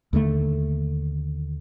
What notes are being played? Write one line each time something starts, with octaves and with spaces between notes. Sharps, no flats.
D#2 D3 F#3 A3